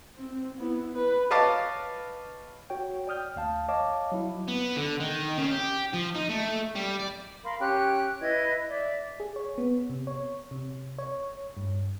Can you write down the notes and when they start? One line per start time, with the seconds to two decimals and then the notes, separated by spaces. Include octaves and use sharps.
0.17 C4
0.58 B3 E4
0.95 B4
1.31 B4 C#5 D#5 F5 A5 D6
2.70 F#4 C#5 G5
3.07 D5 G5 D#6 F6 G6
3.36 D2 F5 A5
3.69 C#5 D#5 F5 A5 D6
4.12 F#3 E4
4.48 B3
4.77 D3
5.00 D#3
5.37 C#3
5.51 G4
5.93 F3
6.14 D#4
6.29 A3
6.75 G3
6.99 D5
7.43 A#4 F5 B5 C6
7.60 C#4 G4 G5 F#6
8.21 E4 B4 D#5 G#6
8.69 D5 E5
9.20 G#4
9.36 C#5
9.58 B3
9.90 C3
10.07 C#5
10.51 C3
10.98 C#5
11.57 G2